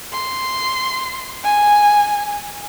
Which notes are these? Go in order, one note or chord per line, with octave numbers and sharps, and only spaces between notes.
C6
G#5